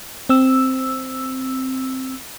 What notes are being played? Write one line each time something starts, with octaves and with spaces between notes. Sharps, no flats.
C4 E6